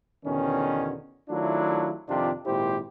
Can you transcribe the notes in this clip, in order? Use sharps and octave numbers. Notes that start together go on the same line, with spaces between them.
E2 B2 D3 D#3 C#4
D#3 F#3 A3 D4 E4 F4
F2 C3 D#3 D4 F4 G4
G#1 A#2 E4 G4 C5